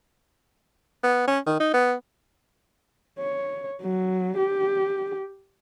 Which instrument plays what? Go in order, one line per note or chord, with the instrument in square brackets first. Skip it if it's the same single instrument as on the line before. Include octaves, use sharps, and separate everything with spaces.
[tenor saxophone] B3
C#4
D#3
D#4
B3
[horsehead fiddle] C#5
F#3
G4